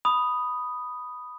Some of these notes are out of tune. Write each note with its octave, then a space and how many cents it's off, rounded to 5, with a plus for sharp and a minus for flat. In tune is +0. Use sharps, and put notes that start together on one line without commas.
B5 +0 D#6 +0